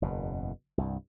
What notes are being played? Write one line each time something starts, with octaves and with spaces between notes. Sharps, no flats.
F#1 E2 B2
C2 G2